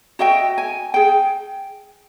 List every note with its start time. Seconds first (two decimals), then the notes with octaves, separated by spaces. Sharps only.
0.19 F#4 D#5 E5 G5
0.58 G#5
0.94 G#4 G5